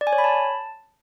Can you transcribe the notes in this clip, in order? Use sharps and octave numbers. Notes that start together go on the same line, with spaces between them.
D5
G#5
C#5
B5
A5